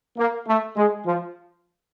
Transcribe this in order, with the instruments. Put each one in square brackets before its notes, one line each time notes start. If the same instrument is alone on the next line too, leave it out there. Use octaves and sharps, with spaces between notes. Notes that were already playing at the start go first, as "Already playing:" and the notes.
[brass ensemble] A#3
A3
G#3
F3